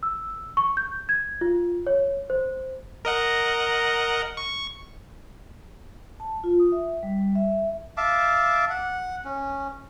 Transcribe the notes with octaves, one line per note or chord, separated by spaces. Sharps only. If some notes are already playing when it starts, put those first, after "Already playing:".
E6
C#6
G6
G#6
F4
C#5
C5
A#4 D#5 F#5
C#6
A5
F4
D#6
E5
G3
E5
E5 F5 A5 D6
F#5
C#4